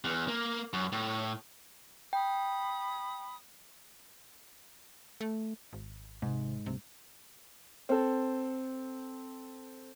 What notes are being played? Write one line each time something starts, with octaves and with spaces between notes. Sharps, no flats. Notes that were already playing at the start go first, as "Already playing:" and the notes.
E2
A#3
F#2
A2
G5 B5 D#6
A3
G#1
G#2 C3 D#3
D2 G2 C3
C4 A4